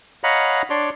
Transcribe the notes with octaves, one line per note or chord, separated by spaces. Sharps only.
C#5 D#5 F5 F#5 A#5 B5
D4 C#5 D5 C6